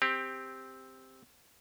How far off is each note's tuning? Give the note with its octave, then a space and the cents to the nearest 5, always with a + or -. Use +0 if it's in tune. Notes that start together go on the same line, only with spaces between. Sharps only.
C4 +0 G4 +15